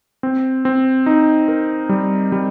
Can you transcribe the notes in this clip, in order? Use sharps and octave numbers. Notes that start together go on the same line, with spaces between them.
C4
C4
D#4
A#4
G3
G3